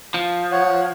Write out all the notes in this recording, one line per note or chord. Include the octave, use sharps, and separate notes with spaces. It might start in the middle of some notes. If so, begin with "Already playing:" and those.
F3
C#5 F#5